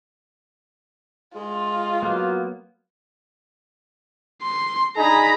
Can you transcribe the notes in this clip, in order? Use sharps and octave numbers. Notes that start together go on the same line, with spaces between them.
G#3 F4
F#3 A#3 B3
C6
D4 D#4 G#4 A#5 B5